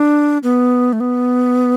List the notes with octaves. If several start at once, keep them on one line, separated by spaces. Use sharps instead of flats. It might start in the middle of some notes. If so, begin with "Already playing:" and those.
Already playing: D4
B3
A3
B3